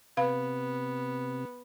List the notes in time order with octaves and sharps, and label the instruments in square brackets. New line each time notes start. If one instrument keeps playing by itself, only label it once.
[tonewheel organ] C3 [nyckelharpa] B3 [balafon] B4 F5 B5